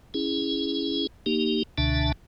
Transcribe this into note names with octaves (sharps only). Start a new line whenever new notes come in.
C#4 E4 G#4
A#3 D#4 G4
C#2 B2 D3 D4 E5 A5